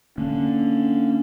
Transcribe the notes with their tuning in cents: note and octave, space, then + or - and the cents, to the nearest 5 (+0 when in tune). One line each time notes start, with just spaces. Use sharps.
D3 +0 A#3 -20 C#4 +0